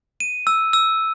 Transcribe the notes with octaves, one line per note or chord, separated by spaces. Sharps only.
D#7
E6
E6